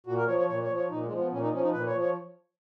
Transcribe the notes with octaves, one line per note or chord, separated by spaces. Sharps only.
A#2 F#4
A#4
F3 C#5
C#5
A#2 C#5
C#5
F3
C#5
A#2 D#4
G#3
F3
B3
A#2 C#4
D#4
F3 C#4
D#4
A#2 B4
C#5
F3
C#5